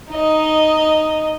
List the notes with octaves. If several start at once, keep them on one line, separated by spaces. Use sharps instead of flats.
D#4 D#5